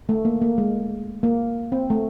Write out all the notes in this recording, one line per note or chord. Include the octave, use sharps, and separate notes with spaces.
A3
A#3
A#3
G#3
A#3
C4
A3